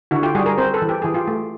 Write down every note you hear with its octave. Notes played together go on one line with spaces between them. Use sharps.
D3 E4 F#4
F4 G4
G3 F#4 G#4
G#4 A#4
C4 A#4 C5
A4 B4
E3
G4
E3 G#4
F4 G4
A3